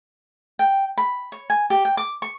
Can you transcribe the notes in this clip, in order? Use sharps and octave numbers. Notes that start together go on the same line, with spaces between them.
G5
B5
C#5
G#5
G4
G5
D6
C#6